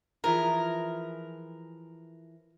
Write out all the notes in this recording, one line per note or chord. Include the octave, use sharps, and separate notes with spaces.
E3 F3 G#4 A#4